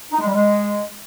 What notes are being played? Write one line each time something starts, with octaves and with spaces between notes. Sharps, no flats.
D#4
G#3
G3
G#3